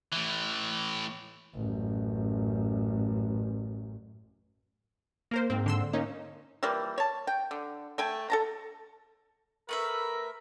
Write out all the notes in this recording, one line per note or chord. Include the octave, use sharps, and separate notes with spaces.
A2 E3
A1 F#2
A#3 A#4 C5
G#2 C4
D3 C6 E6
A#3 C#4 D#4
E3 F3 G3 A#3
C#5 A5
G5
D3
A3 G5 G#5
A4 A5 A#5
A3 A#4 B4 E5